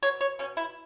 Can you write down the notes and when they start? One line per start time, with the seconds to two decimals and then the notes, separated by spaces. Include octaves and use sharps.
0.03 B2 C#5
0.21 C#5
0.39 B2 C#4
0.57 E4